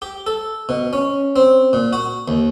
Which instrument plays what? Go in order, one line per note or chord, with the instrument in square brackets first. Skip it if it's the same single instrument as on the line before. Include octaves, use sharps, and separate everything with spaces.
[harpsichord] G4
A4
B2
C#4
C4
A#2
F#4
D#2